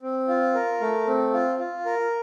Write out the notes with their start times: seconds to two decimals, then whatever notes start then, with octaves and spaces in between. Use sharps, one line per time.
0.02 C4
0.28 F4
0.54 A#4
0.81 A3
1.07 C4
1.33 F4
1.59 F4
1.85 A#4